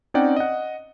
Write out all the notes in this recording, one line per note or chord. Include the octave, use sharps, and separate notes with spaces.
C4 C#4 D#4 D5 F#5 G5
D#5 F#5